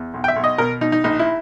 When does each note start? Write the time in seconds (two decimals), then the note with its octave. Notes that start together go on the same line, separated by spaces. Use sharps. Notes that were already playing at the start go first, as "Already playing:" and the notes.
Already playing: E2
0.14 B1
0.24 G5
0.28 E5
0.36 B1
0.44 D#5
0.58 B2 A#4
0.81 B2 D#4
0.92 D#4
1.04 A#1 D#4
1.19 E4